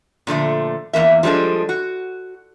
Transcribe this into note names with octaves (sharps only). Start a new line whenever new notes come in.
A#2 D3 F3 A3
E2 G#3 A#3 E5
F3 G3 G#3 D4 A4
F#4